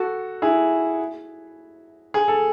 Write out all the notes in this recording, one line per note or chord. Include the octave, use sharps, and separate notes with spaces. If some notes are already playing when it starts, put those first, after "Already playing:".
Already playing: F#4 A4
E4 G#4
G#4
A4